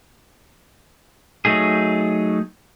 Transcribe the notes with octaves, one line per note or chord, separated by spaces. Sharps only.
F#3 A3 D#4 G#4